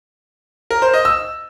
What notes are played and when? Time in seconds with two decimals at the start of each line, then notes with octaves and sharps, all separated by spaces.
0.70 A#4
0.82 C5
0.94 D#5
1.05 E6